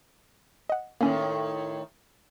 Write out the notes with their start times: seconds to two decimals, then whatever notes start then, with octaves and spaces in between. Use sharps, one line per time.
0.70 D#5 F#5
1.01 A2 D#3 A#3 C#4